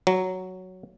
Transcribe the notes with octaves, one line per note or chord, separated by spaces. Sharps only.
F#3